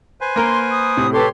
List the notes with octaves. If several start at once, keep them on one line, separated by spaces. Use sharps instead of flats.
B4 C5 G#5
A#3 A#4 C6
D#6
A2 C3
G4 A4 B4 C#5 C6 D6